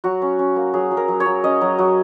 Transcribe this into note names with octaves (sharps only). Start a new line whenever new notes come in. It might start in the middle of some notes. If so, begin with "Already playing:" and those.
F#3 F#4
C#4
C#4
A#3
F#3 G#4
F#3
A#4
F#3
C#5
F#3
C#4 D#5
F#3
F#3